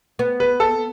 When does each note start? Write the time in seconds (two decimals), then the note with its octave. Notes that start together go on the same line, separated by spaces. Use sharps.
0.19 B3
0.40 B4
0.60 A4